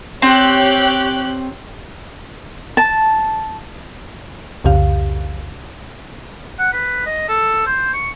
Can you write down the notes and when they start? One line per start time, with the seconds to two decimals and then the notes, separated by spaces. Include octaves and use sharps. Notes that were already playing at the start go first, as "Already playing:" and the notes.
0.22 C4 G4 C#5 F#6
2.77 A5
4.64 C2 F2 C#3 G4 F5
6.59 F#5
6.73 B4
7.06 D#5
7.29 A4
7.67 C5
7.93 C#6